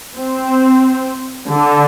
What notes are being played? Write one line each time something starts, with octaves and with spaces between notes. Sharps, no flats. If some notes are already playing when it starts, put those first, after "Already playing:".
C4
D3